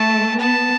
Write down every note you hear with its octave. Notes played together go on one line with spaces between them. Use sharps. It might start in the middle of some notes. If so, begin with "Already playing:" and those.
Already playing: A3 A5
B3 A5